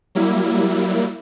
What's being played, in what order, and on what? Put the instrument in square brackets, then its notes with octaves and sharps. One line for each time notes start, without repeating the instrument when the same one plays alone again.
[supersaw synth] F#3 G3 A#3 E4